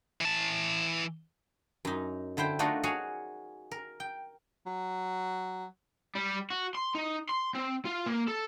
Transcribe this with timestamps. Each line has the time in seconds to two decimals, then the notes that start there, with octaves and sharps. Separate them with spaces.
0.21 E3 A5
1.85 F#2 D#4
2.37 D3 E4 C5 G5
2.59 A3 D4 D#4 F4 F#4 A#4
2.83 F#4 G#4 C#5 F5 G#5
3.71 A#4
4.00 G5
4.66 F#3
6.15 G3
6.50 F#4
6.75 C6
6.95 D#4
7.29 C6
7.55 C4
7.85 F4
8.06 A#3
8.28 A4